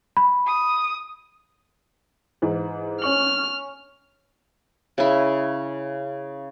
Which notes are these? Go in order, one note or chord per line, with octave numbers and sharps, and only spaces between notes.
B5
D#6
G#2 E3
C#4 C#6 F6 F#7
C#3 E4